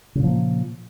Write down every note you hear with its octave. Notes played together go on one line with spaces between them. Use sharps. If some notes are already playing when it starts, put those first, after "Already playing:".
A#2 C#3 F3 A#3